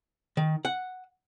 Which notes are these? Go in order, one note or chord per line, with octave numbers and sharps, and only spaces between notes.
D#3
F#5